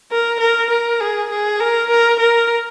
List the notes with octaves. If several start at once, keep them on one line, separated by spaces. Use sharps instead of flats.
A#4
A#4
A#4
G#4
G#4
A#4
A#4
A#4